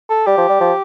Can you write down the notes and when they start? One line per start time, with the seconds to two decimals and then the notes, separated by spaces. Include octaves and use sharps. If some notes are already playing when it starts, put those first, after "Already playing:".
0.10 A4
0.27 G3 G4
0.37 F3
0.49 G3
0.60 F3